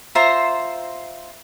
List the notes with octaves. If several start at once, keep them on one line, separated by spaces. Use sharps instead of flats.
F4 C5 E5 A#5